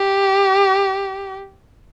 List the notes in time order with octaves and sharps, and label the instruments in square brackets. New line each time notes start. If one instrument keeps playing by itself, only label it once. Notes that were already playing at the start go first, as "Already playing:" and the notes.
Already playing: [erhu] G4